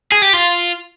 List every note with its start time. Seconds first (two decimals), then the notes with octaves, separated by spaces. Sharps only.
0.12 G#4
0.22 G4
0.33 F4